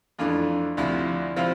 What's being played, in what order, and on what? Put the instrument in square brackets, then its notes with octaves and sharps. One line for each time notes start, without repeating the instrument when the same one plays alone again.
[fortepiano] F2 E3 A3 D4 F4
D2 C3 F3 E4
C3 F3 C4 E4 F4